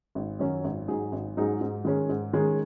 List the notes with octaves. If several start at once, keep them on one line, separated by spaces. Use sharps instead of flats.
G#1
F#2 D#3 F#3 C#4
G#1
G#2 F#3 D#4 G#4
G#1
G#2 F#3 D#4 G#4
G#2
D#3 G#3 C#4
G#2
D#3 G#3 C#4